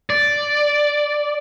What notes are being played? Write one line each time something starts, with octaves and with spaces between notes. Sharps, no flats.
D5